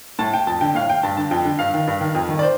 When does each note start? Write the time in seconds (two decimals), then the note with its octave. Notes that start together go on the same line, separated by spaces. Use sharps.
0.19 A2 A5
0.33 G5
0.47 F2 A5
0.61 D3 G5
0.75 A2 F5
0.90 G5
1.03 G2 A5
1.17 D3 A5
1.31 F2 G5
1.45 D3
1.59 G2 F5
1.74 D#3
1.87 G2
2.01 D#3
2.15 F2
2.29 D#3
2.39 D5
2.43 C5